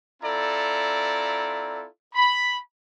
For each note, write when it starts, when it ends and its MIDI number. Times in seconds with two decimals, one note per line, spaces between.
0.22 1.86 60
0.22 1.86 64
0.22 1.86 65
0.22 1.86 69
0.22 1.86 74
0.22 1.86 82
2.14 2.57 83